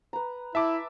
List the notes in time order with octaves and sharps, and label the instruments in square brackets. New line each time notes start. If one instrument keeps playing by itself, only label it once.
[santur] B4 A#5
[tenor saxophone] E4 [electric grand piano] E5 A5 D6